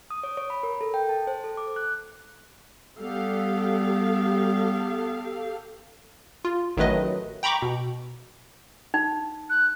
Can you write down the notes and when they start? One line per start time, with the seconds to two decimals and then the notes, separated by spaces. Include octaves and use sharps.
0.11 D#6
0.23 C#5
0.37 C#5
0.50 B5
0.63 A#4
0.81 A4
0.94 G5
1.09 A5
1.27 C5
1.44 A4
1.57 D6
1.76 F#6
3.01 G3 B3 G4 A4 F5
6.45 F4
6.77 A1 D#3 F#3 A3 B4 D#5
7.43 G5 A#5 B5 C#6 D6
7.62 B2
8.94 D#4
9.50 F#6